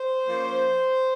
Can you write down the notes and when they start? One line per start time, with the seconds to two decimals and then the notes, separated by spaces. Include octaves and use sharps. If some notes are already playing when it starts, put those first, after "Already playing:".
Already playing: C5
0.24 F3 A#3 C#4